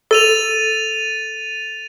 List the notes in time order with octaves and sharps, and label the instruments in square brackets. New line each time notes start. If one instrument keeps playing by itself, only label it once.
[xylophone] A4 [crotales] A6 D#7 F7